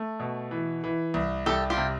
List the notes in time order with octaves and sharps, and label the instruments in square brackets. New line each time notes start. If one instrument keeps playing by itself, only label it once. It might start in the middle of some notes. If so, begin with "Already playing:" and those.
Already playing: [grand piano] A3
B2
E3
E3
C2
[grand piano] C2 [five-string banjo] G4 A4
[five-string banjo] F4 G4
[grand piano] C3